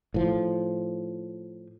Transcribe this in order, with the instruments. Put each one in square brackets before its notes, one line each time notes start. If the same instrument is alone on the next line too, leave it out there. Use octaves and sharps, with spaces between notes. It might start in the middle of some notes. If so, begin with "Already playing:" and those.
[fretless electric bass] A2 F3